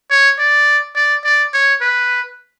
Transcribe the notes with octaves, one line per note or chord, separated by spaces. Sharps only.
C#5
D5
D5
D5
C#5
B4